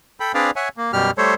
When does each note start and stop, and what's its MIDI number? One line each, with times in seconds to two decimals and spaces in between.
0.20 0.32 69
0.20 0.32 79
0.20 0.32 83
0.34 0.51 60
0.34 0.51 62
0.34 0.51 68
0.34 0.51 71
0.34 0.51 74
0.34 0.51 77
0.56 0.69 73
0.56 0.69 76
0.56 0.69 78
0.56 0.69 80
0.77 0.92 58
0.93 1.11 42
0.93 1.11 47
0.93 1.11 55
0.93 1.11 67
0.93 1.11 89
1.18 1.34 55
1.18 1.34 57
1.18 1.34 69
1.18 1.34 72
1.18 1.34 73